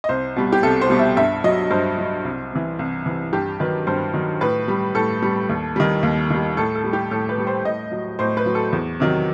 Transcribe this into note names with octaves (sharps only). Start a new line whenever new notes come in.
D#5
C2 C5
B2 G3
G4
C2 A4
C5
B2 G3
E5
G2 E5
F#3 D#5
G2 C5
F#3
C2
C3 E3
C2
C3 E3
G2 G4
D#3 F#3 B4
G2 C5
D#3 F#3
A2 B4
G3
A2 A4
G3
D#2
D#3 G3
D#2
D#3 G3
A2 A4
A4
G3
G4
A2 A4
B4
G3
C5
A2 D#5
F#3
A2 C5
B4
F#3
A4
E2
C3 D#3 F#3